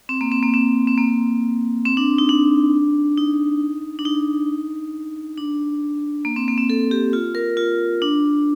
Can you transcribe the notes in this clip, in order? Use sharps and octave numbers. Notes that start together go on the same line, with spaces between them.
C4
A#3
C4
A#3
C4
C4
A#3
C4
D4
D#4
D4
D#4
D4
D#4
D4
A#3
C4
A#3
C4
A4
G4
F4
A#4
F4
D4